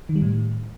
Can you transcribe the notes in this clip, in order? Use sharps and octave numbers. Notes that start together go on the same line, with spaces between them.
D#3
G3
A2